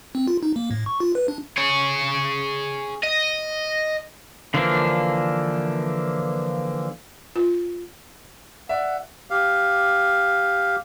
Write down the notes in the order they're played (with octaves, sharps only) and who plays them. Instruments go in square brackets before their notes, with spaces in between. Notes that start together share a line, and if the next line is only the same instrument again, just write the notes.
[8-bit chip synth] C4
F4
D#4
A#3
A2
C#6
F4
B4
D4
[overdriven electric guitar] G#4 C#5
D#5
[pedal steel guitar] D3 E3 F3 A#3 D4
[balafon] F4
[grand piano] D5 E5 [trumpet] F#5
[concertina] G4 F5